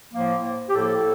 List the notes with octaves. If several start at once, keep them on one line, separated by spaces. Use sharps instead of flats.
A2 F3 A#3
G4
A2 F3 A#3 A4